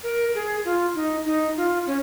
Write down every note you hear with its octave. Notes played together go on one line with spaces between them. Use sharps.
A#4
G#4
F4
D#4
D#4
F4
C#4